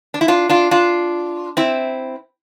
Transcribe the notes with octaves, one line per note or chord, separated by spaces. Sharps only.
D4
E4
D4 F4
D4 F4
D4 F4
C4 E4